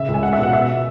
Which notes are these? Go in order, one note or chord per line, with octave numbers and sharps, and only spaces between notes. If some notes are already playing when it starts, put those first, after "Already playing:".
Already playing: C#3 E5
C#2
G#5
G#3 F#5
E5
B2 F#5
B2 E5